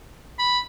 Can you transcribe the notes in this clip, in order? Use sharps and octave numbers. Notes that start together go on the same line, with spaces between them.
B5